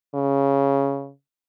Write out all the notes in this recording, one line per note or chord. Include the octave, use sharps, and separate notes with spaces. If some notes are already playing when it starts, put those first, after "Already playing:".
C#3